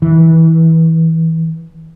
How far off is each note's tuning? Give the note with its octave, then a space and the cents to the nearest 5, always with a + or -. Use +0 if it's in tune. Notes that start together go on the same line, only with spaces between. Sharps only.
E3 -25